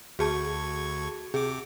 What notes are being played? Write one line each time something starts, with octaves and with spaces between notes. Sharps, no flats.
D2 F#4 G#4 A5 C#6 G#6
C3 G#4 D6